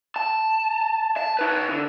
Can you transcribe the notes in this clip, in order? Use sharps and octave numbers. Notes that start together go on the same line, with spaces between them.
A5
A5
D#4 B4
D3